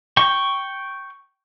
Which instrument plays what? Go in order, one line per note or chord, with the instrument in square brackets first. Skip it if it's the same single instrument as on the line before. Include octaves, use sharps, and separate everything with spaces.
[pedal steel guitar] G5 C#6